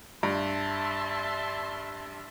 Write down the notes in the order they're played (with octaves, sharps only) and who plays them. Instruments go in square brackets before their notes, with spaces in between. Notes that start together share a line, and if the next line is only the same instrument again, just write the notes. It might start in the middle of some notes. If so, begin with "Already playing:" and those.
[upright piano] G2 [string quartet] E5 A5 C6